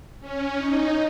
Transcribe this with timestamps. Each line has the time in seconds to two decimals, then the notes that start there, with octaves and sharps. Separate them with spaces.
0.20 C#4
0.57 D#4